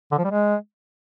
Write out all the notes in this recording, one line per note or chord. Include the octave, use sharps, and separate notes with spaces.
D3
F3
G3
G#3